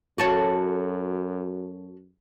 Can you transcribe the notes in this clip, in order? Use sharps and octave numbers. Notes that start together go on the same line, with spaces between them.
F#2 F#4 A4 C#5